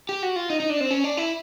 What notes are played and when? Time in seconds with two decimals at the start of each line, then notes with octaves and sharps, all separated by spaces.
0.09 G4
0.23 F#4
0.36 F4
0.50 D#4
0.60 D#4
0.70 D4
0.80 C4
0.91 C#4
1.04 D4
1.17 E4